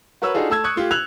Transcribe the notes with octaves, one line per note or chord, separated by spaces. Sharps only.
F#4 A#4 B4 C#5 E6
D4 D#4 F4 F#4 G#4 A4
A3 A5 E6 G#6
C#6 D#6 F#6 G#6 C#7
A3 F4 G4
E6 F#6 G#6 F7 F#7